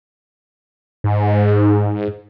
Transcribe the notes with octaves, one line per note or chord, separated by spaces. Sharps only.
G#2